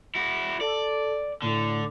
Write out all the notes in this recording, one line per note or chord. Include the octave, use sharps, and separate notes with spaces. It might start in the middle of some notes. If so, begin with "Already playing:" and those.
E4 F#4
A4 D5
A2 D3